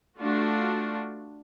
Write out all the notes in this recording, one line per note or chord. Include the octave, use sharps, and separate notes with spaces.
A3 D4 F4 F#4